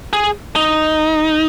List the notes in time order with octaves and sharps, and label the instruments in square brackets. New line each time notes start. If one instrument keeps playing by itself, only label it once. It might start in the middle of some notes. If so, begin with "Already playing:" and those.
[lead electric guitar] G#4
D#4